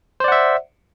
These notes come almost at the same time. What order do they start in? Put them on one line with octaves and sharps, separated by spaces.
C5 D5 F#5 E5